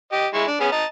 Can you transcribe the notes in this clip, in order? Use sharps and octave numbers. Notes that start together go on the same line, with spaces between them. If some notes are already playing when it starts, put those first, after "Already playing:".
G4 D#5
G#3 E4 C#6
D4
B3 C#4 G#4
D#5 A5 A#5